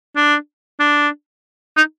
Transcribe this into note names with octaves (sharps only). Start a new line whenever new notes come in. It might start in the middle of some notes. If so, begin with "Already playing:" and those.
D4
D4
D#4